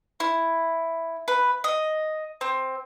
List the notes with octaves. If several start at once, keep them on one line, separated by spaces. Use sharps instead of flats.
E4
B4
D#5
C4